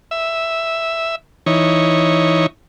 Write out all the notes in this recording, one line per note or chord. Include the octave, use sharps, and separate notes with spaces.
E5
E3 D#4 C#5